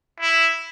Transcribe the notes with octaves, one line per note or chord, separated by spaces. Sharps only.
E4